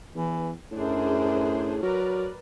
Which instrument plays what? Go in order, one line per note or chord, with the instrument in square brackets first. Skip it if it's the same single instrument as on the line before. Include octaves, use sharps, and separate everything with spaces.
[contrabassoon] E2 [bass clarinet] E3
[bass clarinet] F#2 [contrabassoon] A2 [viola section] D4 G#4 C5
[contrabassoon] F#3 [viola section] A#4 B4 D5